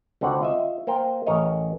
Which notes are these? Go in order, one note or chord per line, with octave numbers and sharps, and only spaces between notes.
C#2 D3 C4 D4 F#4 F#5
F4 D#5 E5
A#3 A#4 C5 G5
A1 A#4 C#5 D#5